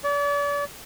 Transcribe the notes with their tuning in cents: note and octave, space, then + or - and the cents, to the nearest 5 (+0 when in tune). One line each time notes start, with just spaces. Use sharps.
D5 -40